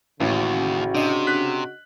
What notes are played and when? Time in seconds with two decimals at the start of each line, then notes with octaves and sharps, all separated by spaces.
0.20 A1 D#2 C#3 F#4
0.95 C3 D4 D#5
1.27 F#6 B6